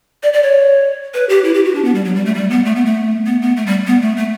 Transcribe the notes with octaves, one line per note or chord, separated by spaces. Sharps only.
D5
D5
C#5
B4
G4
E4
G4
F#4
D4
B3
G3
F#3
G3
A3
G3
B3
A3
B3
A3
B3
B3
A3
G3
B3
A3
A3